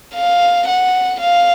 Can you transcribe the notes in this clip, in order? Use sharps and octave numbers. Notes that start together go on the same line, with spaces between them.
F5
F#5
F5